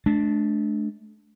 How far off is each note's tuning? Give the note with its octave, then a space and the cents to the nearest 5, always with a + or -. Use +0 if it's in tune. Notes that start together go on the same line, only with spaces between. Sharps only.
A3 -40 D4 +0